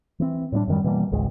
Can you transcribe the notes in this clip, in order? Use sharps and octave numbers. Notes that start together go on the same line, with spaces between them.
E3 C4
A2 G3 B3 D4
F#2 D#3 G3
B2 E3 G3 A#3
G#1 C#2 G#3